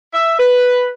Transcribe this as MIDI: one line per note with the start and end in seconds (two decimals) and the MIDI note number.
0.14 0.37 76
0.39 0.89 71